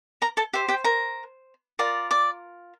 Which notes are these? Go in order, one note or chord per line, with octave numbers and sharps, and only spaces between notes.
A#4 A#5
A4 A5
G4 C5 E5
G4 G5
A#4 A#5
F4 A#4 D5
D5 D6